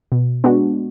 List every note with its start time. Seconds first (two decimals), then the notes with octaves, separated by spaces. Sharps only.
0.12 B2
0.44 G#3 B3 D4 F#4